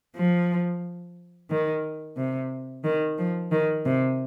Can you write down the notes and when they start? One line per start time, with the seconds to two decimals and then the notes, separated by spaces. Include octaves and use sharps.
0.16 F3
1.50 D#3
2.17 C3
2.84 D#3
3.18 F3
3.52 D#3
3.85 C3